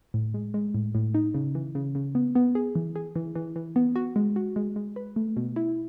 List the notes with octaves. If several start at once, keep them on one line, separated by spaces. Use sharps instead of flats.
A2
G#3
G#3
A2
A2
D#4
C#3
E3
C#3
C#3
B3
B3
G#4
E3
G#4
E3
E3
E3
B3
F#4
G#3
F#4
G#3
G#3
B4
A3
B2
E4